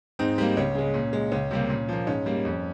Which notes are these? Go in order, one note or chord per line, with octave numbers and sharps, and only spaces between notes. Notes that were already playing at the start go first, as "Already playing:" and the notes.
G#2 C4 D#4
G3 A#3
C#2 C#4
C#3 G#3
A#2
G#3
C#2 C#4
C3 G3 A#3
A#2
F3 A#3
G#2 C#4
G3 A#3
F2